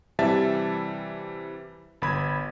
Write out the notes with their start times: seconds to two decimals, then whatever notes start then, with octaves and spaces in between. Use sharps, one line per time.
0.19 C3 E3 G3 E5 A5 A6
2.02 G1 B5 G#6